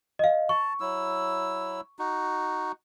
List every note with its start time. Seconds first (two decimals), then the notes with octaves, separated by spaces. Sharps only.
0.19 D#5 F5
0.49 A5 C#6
0.80 F#3 E4 E6
1.99 D#4 F#4